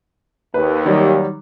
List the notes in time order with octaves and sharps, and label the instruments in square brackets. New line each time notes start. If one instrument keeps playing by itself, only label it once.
[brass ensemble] D#2 [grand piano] B4
[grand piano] D#3 F#3 G3